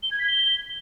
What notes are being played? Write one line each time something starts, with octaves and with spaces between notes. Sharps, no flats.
G7
G#6
B6
G7